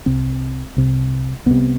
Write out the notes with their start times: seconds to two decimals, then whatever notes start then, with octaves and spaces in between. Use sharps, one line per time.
0.06 C2 C3 C4
0.77 C2 C3
1.46 C2 C3 B3